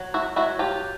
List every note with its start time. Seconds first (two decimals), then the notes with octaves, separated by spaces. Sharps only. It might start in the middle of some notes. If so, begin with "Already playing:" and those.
Already playing: F#3
0.14 E4 F#4
0.36 F#3 E4 F#4
0.59 F4 G4